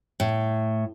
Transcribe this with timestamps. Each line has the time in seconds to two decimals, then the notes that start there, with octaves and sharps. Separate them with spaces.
0.20 A2